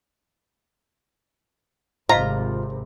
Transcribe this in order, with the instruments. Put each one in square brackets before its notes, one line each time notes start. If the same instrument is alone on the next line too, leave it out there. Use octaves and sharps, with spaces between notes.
[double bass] G#1 C3 [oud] F4 [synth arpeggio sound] C5 D#5 B6 [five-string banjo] A#5